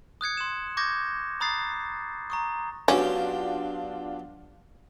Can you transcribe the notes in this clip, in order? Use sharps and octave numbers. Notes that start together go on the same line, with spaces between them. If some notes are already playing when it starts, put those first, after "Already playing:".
D#6 F#6 G#6 C#7
C6 E7
C#6 D6 G6 G#6 A#6
A#5 B5 D#6 F#6 A6 C7
A#5 C#6 D#6
F#3 B3 C#4 D4 F4 G4